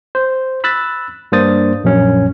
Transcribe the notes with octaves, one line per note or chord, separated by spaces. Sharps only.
C5
B5 E6 F#6 A6
G2 A#3 D4 C5 D#6 A6
A#1 F#2 C#4